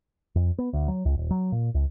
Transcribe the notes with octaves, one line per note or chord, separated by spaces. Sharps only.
F2
B3
D2
F#3
C#2
D#1
F#3
A#2
C#2